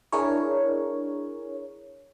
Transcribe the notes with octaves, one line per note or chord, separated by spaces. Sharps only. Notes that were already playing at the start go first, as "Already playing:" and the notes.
D4 E4 G#4 A#4 C#5